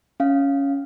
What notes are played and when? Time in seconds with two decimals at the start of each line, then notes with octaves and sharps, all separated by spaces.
0.20 C#4 F5